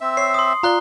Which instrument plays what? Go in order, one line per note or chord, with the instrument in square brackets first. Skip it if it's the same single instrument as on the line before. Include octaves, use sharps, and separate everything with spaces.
[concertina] C4 E5
[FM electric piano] C#5 [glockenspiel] C7
[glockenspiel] C6 D#6
[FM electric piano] F4 D5 [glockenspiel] A#5 F#6 G7